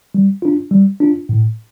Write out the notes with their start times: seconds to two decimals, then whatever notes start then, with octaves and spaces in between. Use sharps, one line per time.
0.15 G3
0.42 D4 F4
0.71 G3
1.00 D4 F4
1.29 A2